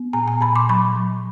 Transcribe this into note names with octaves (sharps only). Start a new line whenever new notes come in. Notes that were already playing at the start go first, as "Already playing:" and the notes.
Already playing: B3
A#2 G#5 A#5
G#5 A#5
A#2 A5 B5
C6 D6
F#3 B5 C#6
F#3